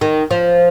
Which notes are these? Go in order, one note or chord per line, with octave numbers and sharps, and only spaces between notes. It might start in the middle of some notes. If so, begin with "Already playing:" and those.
D#3
F3